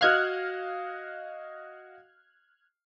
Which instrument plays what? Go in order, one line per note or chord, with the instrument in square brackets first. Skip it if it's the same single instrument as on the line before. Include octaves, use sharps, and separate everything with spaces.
[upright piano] F#4 D#5 F5 [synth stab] F6 F#6 G#6